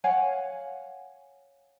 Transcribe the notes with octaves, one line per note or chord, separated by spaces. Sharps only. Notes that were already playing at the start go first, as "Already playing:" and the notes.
C#5 F5 F#5 G#5